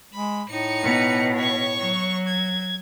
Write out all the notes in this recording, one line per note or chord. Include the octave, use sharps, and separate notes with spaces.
G#3 B5
A2 D#4 C#7
B2
C#5 C#6
F#3
G#6